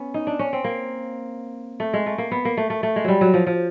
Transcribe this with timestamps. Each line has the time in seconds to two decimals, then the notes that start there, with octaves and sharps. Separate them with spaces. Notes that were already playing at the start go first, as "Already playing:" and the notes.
Already playing: B3 C#4
0.14 D#4
0.27 D4
0.39 C#4
0.53 C4
0.64 A#3
1.80 A3
1.93 G#3
2.06 A3
2.18 A#3
2.31 B3
2.45 A#3
2.57 A3
2.70 A3
2.83 A3
2.96 G#3
3.04 F#3 G3
3.21 F#3
3.34 F3
3.47 F3